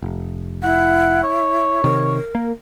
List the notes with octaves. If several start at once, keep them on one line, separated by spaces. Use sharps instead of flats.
F1
E4 F#5
C#5
C3 D#3 A#4
A#3